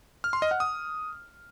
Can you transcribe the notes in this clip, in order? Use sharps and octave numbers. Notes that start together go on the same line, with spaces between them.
F6
C6
D#5
F#5
D#6